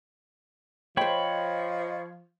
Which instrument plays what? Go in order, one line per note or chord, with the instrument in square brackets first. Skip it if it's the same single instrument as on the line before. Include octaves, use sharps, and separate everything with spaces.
[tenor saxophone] F3 [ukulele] C5 G5 [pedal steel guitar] C#5 B5 [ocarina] D#5